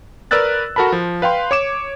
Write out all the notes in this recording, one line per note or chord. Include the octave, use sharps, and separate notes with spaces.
A#4 B4 D5 E6 F#6 A6
F#4 A4 A#4 A5 B5
F3
B4 F5 G5 C6
C#5 D6 E7